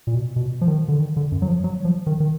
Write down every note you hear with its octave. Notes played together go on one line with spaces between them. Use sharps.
A#2
B2
B2
F3
D#3
D3
D#3
D3
F#2
F#3
F3
F#3
F3
D#3
D#3